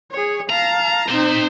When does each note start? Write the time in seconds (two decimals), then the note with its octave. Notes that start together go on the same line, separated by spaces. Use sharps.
0.11 G#4 C#5
0.49 F5 A5 A#5
1.09 C4 D#4 C5 A#5